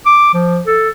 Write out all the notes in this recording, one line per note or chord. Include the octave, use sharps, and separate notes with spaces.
D6
F3
A4